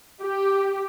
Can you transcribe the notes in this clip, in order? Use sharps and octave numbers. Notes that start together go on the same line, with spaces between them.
G4